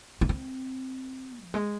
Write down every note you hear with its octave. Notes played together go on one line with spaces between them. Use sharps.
D#4
C4
F3
G#3